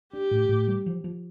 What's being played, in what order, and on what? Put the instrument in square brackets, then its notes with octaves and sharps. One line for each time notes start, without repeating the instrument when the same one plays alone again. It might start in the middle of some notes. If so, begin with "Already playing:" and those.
[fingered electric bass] D4 [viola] G4
[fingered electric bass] A2
A2
G3
F3
F3